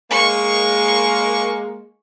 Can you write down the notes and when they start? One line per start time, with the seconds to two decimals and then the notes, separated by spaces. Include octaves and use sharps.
0.11 G#3 A#3 C#6